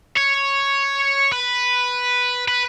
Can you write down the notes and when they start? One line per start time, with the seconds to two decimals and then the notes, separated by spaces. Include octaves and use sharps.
0.17 C#5
1.32 B4
2.48 B4